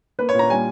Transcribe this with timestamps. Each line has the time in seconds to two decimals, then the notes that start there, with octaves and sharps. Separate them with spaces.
0.19 A#3 B4
0.29 C#5
0.35 A#2 A#5
0.50 G3 G#5